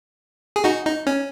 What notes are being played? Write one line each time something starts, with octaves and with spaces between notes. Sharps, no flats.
G#4
D#4 F#4
D#4
C#4